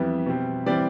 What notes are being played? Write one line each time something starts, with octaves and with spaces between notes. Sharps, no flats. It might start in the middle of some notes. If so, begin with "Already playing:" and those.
Already playing: F2 E3 G3 B3 E5
B2 G3 C4
E3 G3 C4 D5